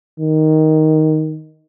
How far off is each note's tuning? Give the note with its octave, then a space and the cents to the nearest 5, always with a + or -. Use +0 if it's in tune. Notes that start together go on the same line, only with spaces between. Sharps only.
D#3 +5